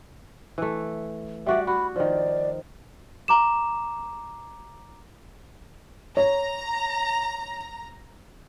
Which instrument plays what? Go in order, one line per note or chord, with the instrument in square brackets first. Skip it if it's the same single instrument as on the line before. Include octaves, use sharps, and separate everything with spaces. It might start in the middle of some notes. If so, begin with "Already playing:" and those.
[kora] E3 A3
[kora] G3 F#4 D5 [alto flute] E5
[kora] F#4 [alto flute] B5
[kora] D#3 F3 [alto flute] D5
[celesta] A#5 D6 E7
[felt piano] C#5 [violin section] A#5